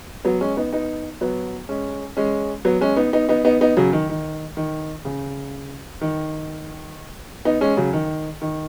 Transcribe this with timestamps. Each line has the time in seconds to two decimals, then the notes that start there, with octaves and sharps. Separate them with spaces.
0.25 F#3 B3
0.41 G#3 C#4
0.57 B3 D#4
0.73 B3 D#4
1.21 F#3 B3
1.69 G#3 C#4
2.17 G#3 C#4
2.65 F#3 B3
2.81 G#3 C#4
2.97 B3 D#4
3.13 B3 D#4
3.29 B3 D#4
3.45 B3 D#4
3.61 B3 D#4
3.77 C#3 F#3
3.93 D#3
4.09 D#3
4.57 D#3
5.05 C#3
6.01 D#3
7.45 B3 D#4
7.61 G#3 C#4
7.77 C#3 F#3
7.93 D#3
8.41 D#3